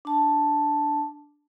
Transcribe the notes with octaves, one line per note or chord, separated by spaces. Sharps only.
D4 A5